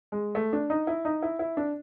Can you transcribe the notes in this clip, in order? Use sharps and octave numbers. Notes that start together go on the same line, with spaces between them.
G#3
A3
D4
D#4
E4
D#4
E4
E4
D4